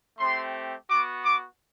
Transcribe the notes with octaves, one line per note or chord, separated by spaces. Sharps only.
A3 C4 G4 C6
B3 F#4 D6
D6